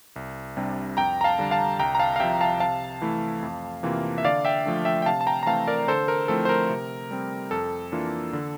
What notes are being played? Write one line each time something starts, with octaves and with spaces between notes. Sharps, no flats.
C2
C3 G3 D4
F2 G5 A#5
A#5
F5 A5
D3 G3 D4
F5 A5
C2 G5 A#5
A#5
F5 A5
F5
C3 F3 E5 G5
F5 A5
C3 F5 A5
E3 A3 E4
F2
C3 E3 A#3 F4
E5
D3 D5 F5
E5 G5
F3 A3 D4
E5 G5
G5
C3 F5 A5
A5
G5 A#5
A#5
E3 A3 C4 F5 A5
A#4 D5
D3 A4 C5
A#4
F3 A3 C4 E4 A4
C5
A#4
C3
G3 C4
F2 A4
E3 A#3 D4 F4
D3